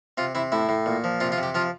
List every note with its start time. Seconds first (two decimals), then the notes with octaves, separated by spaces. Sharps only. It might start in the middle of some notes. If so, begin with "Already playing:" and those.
0.18 C3 F4
0.35 C3 E4
0.52 A2 E4
0.69 A2
0.86 A#2
1.04 F3
1.20 C3 F4
1.32 F4
1.38 C3
1.43 G4
1.55 F3 F4